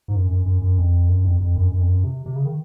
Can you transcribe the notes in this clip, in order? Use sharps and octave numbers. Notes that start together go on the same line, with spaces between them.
G#2
F#2
F#2
F#2
F#2
F2
F#2
F2
F2
F#2
F#2
F2
F#2
C3
C3
C#3
D#3